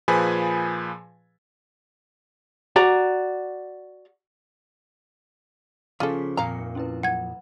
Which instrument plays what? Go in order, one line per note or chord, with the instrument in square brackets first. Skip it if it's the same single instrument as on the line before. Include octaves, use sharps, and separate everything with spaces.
[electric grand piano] A#2 F3 G#4 B4 G#5 B5
[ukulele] F#4 D5 A#5
[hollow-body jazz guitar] C#3 F3 [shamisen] F4 A4 [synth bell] D6 B6
[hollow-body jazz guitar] F2 A#2 A#3 [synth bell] D#3 C4 C#7 [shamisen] F5 A#5
[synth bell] F3
C#4 E4 B4
[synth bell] F#3 [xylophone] F#5 G#6